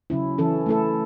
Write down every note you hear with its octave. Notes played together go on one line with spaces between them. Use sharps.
C#3 F#3 C#4 E4
E3 C#4 E4 A4
A3 E4 A4